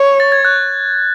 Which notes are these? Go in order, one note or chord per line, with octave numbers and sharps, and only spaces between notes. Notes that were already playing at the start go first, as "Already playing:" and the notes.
Already playing: C#5
A6
G#6
F#6